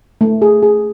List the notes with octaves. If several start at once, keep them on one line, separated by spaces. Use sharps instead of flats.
A3
G#4
G#4